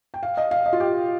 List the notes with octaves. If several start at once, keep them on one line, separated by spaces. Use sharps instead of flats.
G5
F5
D#5
F5
D#5
F4
G4